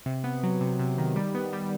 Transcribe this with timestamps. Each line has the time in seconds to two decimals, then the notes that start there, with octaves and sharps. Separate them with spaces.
0.06 C3
0.24 B3
0.43 F#3
0.61 C3
0.79 C3
0.98 D#3
1.16 G3
1.35 B3
1.53 G3